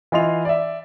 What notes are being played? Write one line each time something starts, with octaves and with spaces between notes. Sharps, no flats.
E3 F4 D#5 C6 F7
D5 E5